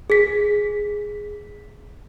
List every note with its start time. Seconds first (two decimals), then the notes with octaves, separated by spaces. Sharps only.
0.10 G#4 B6